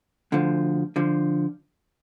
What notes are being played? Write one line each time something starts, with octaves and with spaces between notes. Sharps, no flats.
D2 D3 F3
D3 F3